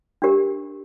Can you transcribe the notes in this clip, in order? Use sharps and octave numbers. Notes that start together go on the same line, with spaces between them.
D4 G4 A#4